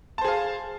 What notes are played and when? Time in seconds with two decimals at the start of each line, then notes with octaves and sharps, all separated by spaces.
0.18 A5
0.21 C5
0.25 G#4
0.28 F5